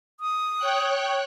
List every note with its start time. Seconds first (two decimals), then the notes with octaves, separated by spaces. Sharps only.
0.20 D#6
0.57 C#5 G5 F#6